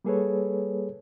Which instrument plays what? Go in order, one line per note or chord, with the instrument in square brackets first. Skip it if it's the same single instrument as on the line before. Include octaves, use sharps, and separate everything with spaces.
[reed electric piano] G3 A#3 G#4 A4 B4 C#5